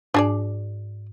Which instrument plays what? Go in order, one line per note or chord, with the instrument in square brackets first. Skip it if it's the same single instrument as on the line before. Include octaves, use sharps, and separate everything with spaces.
[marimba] G#2 [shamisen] D4 G#4 D5